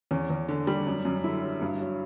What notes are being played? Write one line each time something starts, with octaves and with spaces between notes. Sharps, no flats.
E2 C#4
E2
D3
G3
F#2
F#2
D3 E4
F#3
G2
F#3